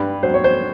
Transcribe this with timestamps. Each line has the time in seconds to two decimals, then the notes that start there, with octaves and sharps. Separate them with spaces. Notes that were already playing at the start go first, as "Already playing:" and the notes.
Already playing: G2 B4
0.23 F#3 C5
0.34 C#5
0.44 C5